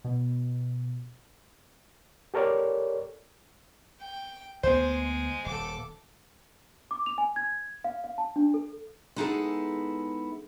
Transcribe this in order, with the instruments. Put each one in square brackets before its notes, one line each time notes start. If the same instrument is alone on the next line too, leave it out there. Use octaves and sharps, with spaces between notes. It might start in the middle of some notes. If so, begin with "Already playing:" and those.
[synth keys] B2
[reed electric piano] G4 A4 A#4 C#5 D5
[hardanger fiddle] G5
[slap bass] D2 B3 [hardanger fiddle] G#3 [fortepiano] C5
[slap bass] D#1 [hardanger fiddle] A4 D6
[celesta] D6
F7
G#5
G#6
F5
F5
A5
D4
A4
[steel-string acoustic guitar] G#3 B3 D#4 E4 G#4 A4